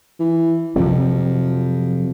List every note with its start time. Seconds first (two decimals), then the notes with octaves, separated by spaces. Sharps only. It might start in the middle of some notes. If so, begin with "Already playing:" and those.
0.19 E3
0.76 F2 C3 F3 F#3